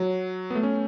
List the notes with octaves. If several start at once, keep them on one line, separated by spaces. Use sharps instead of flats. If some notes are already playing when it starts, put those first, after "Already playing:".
Already playing: F#3
B3
A3
C#4